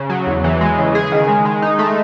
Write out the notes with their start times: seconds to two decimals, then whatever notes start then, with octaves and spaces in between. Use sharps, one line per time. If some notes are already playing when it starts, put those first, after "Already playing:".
Already playing: C#3
0.10 F#3
0.27 E2
0.44 E3
0.61 G#3
0.78 C#3
0.95 G#4
1.12 D#3
1.28 G#3
1.45 G#3
1.62 D#4
1.79 A3